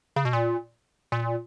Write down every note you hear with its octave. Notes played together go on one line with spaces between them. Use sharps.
C#3
B2
A#2
A#2